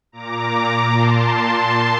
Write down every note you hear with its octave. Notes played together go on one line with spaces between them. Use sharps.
A#2 A#5 D6
A#2 A5 C6
A5 C6